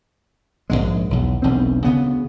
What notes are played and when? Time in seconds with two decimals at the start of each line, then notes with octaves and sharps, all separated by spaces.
0.70 A#1 F2 G#2 G#3
1.10 B1 E2
1.42 E1 B1 E3 C4
1.84 D2 C#3 B3